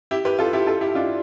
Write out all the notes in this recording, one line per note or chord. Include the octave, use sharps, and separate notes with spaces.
E4 G4
G4 B4
F4 A4
E4 G4
F4 A4
E4 G4
D4 F4